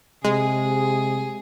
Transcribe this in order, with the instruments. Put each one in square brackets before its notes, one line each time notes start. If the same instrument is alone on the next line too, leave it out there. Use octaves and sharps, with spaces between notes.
[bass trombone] C3 [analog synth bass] G#3 [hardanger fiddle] G#4